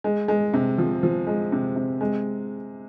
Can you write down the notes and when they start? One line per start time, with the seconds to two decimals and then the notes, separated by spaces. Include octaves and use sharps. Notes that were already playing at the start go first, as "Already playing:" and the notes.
0.04 G#3
0.28 G#3
0.54 C3
0.78 F3
1.03 F3
1.27 G#3
1.52 C3
1.76 C3
2.01 G#3